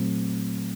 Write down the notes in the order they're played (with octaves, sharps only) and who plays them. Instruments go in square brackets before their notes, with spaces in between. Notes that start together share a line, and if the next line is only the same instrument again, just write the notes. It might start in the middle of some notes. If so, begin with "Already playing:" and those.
Already playing: [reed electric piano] A#2 F#3 A3 C4